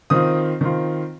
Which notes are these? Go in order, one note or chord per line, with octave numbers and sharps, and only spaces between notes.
D#3 C4 F4 D#6
D#3 C4 F4